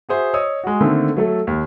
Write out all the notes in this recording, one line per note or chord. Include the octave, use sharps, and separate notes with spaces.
F#4 G#4 C5 E5
C#5 D#5 D#6 E6
G#3 F#4
D3 D#3 A3 A#3 C4
F#3 A3 A4
D#2